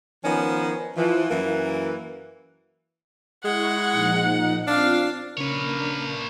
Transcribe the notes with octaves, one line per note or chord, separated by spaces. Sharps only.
D#3 F3 B3 C#4
E3 F3
F#2 E3 F#3 A#3
G#3 E4 F#5 C#6 F#6
A#2 F3 D#4
C4 D4 F4 F5
C#3 A#3 C#4 D4 A#4 B4 C#5